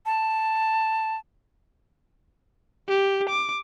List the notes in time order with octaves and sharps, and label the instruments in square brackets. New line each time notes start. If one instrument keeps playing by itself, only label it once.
[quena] A5
[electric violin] G4
D6